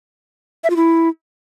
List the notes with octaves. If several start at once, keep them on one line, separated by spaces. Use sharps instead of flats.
E5
F4
E4